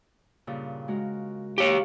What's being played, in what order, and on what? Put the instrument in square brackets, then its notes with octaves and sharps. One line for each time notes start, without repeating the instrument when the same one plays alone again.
[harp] G2 A#2 C#3
G#3 F#4 A#4
[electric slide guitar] G4 C#5 [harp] F5